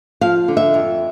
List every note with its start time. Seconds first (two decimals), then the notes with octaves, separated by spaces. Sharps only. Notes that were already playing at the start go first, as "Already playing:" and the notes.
0.21 F3 F5
0.48 D3
0.57 E5
0.74 F2